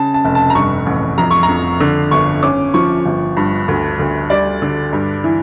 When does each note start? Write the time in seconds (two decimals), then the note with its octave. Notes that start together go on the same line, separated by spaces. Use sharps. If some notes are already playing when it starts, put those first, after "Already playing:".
Already playing: C#3 A5
0.14 A5
0.25 F1
0.35 A5
0.50 A#5
0.55 G2 C#6
0.86 A1
1.18 F2 A#5
1.31 C#6
1.43 A#5
1.48 F2
1.80 D3
2.11 G1 C#6
2.43 C#4 D6
2.74 F3 C#6
3.06 G1
3.37 G2
3.68 D2
3.99 D2
4.30 G3 D5
4.62 D3
4.93 G2
5.24 E3